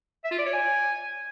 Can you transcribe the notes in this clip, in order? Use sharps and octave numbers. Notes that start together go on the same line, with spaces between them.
E5
F4
D5
C#5
G#5